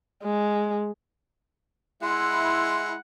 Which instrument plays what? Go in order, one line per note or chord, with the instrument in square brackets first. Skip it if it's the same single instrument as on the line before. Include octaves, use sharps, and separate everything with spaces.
[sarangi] G#3
[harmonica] G#3 [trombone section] E4 [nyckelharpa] F#5 [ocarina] C6